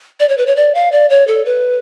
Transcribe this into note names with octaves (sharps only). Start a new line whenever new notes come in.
D5
C#5
B4
C#5
D5
F5
D5
C#5
A4
B4